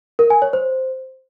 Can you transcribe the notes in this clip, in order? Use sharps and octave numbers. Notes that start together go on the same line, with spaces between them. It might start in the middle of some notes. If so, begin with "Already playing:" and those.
A#4
G#5
C#5
C5